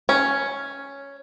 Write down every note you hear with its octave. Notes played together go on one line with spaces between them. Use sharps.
C#4